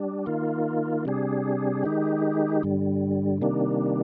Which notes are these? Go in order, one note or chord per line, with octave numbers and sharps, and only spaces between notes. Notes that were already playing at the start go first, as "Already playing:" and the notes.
Already playing: G3 D4
D#3 A#3 F4
C3 G3 D4 G#4
D#3 G#3 D#4 G4
G2 D3 G3
C3 D#3 G3 A#3 D4